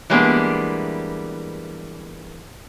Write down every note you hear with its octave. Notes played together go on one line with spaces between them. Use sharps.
E3 G3 G#3 A#3 B3 D4